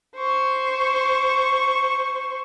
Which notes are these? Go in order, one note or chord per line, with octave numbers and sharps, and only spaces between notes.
C5 C#6